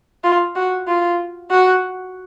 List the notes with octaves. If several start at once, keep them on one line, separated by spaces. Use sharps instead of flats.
F4
F#4
F4
F#4